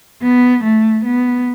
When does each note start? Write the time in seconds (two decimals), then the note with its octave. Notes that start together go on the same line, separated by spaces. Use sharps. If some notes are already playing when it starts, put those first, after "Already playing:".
0.22 B3
0.64 A3
1.05 B3